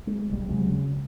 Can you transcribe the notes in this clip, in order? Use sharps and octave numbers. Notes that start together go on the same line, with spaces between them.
G#3
E1 B1 G3
D#2 C3 F#3 G#3
C#3